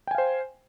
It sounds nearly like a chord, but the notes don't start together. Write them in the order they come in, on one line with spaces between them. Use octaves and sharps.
G5 G#5 F5 C5